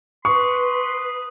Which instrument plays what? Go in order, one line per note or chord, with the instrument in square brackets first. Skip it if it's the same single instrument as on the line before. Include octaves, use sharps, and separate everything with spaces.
[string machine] B4 [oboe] C6 [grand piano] C#6 [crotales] D#6